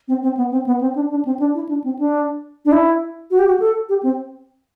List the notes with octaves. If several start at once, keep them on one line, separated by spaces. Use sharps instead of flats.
C4
C4
B3
C4
B3
C4
D4
D4
C4
D4
E4
D4
C4
D4
D4
E4
F#4
G4
F#4
A4
G4
C4